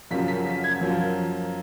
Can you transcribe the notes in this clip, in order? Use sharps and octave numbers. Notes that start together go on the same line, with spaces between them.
F#2 C#3 F3 A#3 B6
B6
B6
G#6
F#2 F3 A#3